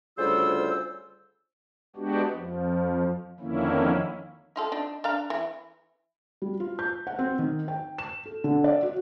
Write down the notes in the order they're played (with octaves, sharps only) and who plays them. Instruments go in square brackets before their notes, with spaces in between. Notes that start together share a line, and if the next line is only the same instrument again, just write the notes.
[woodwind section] D2 C#3 G3 F4 C5 E6
[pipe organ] G#3 B3 D4 F#4 G4
F2 F3
F2 D3 D#3 A#3 C#4 E4
[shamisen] D#4 F4 A4
D4 D#4
D4 F5 A#5
E3
[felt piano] G3
F4
G6
F#5
C4
D#3
G5
E7
A4
D3
D5
F#4